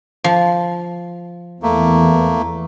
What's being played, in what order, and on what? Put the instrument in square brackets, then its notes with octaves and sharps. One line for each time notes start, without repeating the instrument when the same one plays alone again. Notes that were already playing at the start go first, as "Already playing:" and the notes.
[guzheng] F3
[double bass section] E2 [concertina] A3 A#3